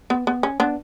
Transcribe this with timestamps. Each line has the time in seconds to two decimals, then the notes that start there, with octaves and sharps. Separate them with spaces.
0.10 B3
0.27 B3
0.43 C#4
0.60 B3 D4